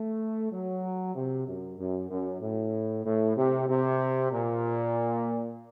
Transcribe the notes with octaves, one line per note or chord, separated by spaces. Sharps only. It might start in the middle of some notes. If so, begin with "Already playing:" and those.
Already playing: A3
F#3
C3
F#2
F#2
F#2
A2
A2
C3
C3
A#2